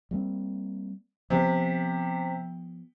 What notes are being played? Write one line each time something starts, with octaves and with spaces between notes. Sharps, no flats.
G3 A#3 C4
C3 F3 B3